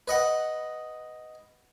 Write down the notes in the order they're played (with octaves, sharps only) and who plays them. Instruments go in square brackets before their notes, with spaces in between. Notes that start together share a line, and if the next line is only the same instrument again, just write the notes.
[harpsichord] B4 D#5 F#5